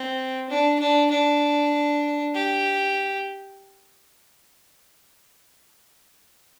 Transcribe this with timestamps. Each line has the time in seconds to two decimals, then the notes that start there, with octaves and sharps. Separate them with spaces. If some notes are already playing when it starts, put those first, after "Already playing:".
Already playing: C4
0.49 D4
0.80 D4
1.11 D4
2.34 G4